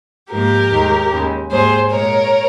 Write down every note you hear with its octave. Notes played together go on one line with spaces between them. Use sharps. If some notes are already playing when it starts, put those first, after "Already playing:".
G#2 F3 A#3 G4 A#4
D#2 D#3 G#3
D#2 C#3 G#3
G#2 G3 A#3 G#4 C5
A#2 G#3 A#4 C#5